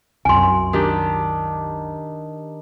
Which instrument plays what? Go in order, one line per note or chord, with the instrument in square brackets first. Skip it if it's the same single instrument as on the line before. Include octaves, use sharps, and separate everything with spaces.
[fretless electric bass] C2 F#2 [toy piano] G#5 C6
[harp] D#3 D4 G4